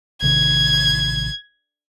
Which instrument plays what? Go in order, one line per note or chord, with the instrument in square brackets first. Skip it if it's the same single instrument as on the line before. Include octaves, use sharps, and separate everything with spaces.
[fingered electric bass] A1 C3 D#3 [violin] G#6